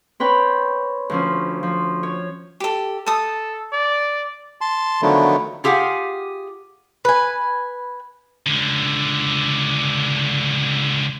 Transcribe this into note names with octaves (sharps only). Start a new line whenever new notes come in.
C4 B4 C#5 G5 B5
D2 F3 C#4
F3
C#5
G4 A4
A4 A5 D#6
D5
A5 C6
D3 D#3 F3 F#3 A3 B3
F4 G4 G#4 F5 F#5
B4 G#5
C#2 D3